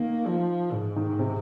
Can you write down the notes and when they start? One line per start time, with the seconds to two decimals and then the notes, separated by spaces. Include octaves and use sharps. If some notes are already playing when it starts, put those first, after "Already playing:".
Already playing: D#3 A#3
0.27 F3
0.72 G#2
0.96 D#3
1.19 C3